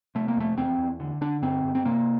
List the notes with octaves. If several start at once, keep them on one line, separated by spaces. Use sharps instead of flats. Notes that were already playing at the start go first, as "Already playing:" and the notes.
C3 A3
A#3
F2 A3
E2 C4
E2
D3
D3 D4
G2 C4
G2
C4
C3 A#3